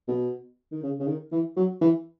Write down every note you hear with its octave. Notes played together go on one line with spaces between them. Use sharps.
B2
D#3
C#3
C#3
D#3
E3
F#3
E3